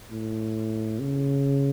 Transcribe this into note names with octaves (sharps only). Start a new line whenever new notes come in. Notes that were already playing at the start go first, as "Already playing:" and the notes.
A2
C#3